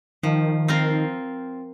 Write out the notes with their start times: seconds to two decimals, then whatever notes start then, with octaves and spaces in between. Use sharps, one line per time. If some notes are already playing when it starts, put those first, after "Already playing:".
0.23 D#3 F3
0.68 C4 F4 A#4